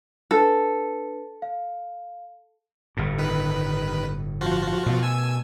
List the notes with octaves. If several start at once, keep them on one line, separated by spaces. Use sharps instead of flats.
D4 A4 B4
F5
G1 A2
D#3 B4
F3 F4 F#4
B2 A3
G#5 E6